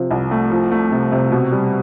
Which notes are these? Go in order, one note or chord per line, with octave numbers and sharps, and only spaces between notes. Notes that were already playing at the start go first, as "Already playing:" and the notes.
Already playing: C3 F3
C2
A3
F3
A3
C3
C3
B2
G3